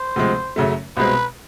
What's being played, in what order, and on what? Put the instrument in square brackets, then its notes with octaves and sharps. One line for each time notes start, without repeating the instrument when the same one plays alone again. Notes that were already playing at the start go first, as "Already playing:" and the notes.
Already playing: [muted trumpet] C5
[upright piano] D2 C3 F3 G#3 C4
F#2 C#3 F#3 A3
[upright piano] C2 B2 G#3 C4 [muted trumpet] B4